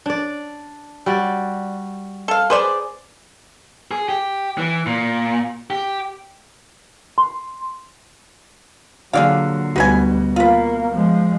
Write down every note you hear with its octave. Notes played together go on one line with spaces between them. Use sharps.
D4 D5
G3 F#4 D5
A4 F5
G#4 B4 C5 D5
G#4
G4
E3
A#2
G4
C6
A#2 D3 F#3 F#4 G#4 D5 F5
D2 B2 G3 D#4 F#4 B4 G#5
A#3 F4 B4
F3 G#3